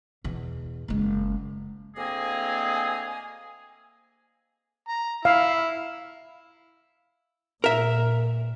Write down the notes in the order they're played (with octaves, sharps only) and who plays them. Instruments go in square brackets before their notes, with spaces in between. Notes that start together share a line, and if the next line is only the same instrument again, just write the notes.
[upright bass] E2 B2
F#1 G#3
[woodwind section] D2 A#3 C4 G#4 D#5 G#5
[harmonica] A#5
[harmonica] E4 [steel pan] F5
[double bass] A#2 [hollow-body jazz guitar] A#4 E5